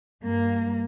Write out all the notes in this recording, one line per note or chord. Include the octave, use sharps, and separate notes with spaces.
G2 A#3